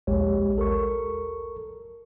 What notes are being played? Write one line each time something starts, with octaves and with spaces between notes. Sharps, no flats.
A#1 D#2 G#3 G4 C#5
A4 A#4 C#6